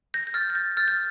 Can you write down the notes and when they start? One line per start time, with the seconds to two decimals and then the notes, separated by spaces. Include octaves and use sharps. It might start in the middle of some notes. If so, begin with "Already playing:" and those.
0.14 G6 A#6
0.27 G6
0.34 F6 A6
0.50 A6
0.55 G6
0.77 F6 A6
0.88 G6